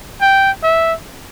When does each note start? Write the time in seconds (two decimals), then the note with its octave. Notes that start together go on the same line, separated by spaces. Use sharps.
0.21 G5
0.63 E5